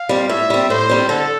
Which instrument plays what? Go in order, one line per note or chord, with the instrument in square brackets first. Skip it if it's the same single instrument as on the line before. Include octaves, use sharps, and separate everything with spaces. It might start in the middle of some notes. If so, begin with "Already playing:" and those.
Already playing: [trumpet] F5
[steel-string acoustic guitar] G3 C4
[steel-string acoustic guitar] A2 [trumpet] E5
[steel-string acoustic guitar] G3 C4
[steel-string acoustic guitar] A2 [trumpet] C5
[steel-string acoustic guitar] G3 C4
[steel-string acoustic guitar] D3 [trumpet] A4